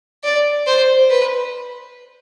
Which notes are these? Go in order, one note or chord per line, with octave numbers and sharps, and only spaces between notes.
D5
C5
B4